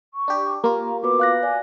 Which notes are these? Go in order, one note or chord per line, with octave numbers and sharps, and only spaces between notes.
C#6
D4 G4
A#3 F4 G4 A#5
B3 F#4 B4 D6
F5 F#6 A#6
D5 G#5